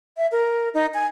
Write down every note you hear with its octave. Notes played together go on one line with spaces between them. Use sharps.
E5
A#4
D#4
G#5